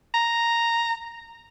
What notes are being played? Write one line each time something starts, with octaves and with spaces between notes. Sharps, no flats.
A#5